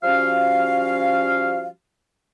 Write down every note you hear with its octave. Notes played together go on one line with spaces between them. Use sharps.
F3 G3 C#4 F#4 F5